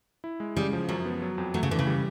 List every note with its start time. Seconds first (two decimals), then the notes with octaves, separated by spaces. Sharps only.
0.24 E4
0.40 G#3
0.57 C#3 G3
0.73 F3
0.89 F#2 F#3
1.05 B3
1.22 F#3
1.38 F2
1.54 F#3 A3
1.63 C#3
1.71 D3 E3
1.79 C#3
1.87 G3